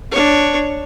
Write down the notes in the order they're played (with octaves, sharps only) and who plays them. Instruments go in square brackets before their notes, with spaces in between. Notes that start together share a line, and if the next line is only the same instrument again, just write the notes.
[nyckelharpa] D4 C#5